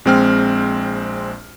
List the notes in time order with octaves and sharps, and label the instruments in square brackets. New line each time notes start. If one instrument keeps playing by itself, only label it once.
[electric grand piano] A#1 G#3 C4 G5 F6